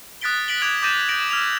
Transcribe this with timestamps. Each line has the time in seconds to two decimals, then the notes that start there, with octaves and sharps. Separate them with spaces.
0.21 D#6 F#6 A6 B6 D7 G7
0.48 B6 D7 F#7 G7
0.62 D6 F#6 G#6 D7 F7
0.82 D6 G6 A6 A#6 D#7 E7
1.08 G6 G#6 A#6 D7 F#7
1.30 E6 F6 G#6 F7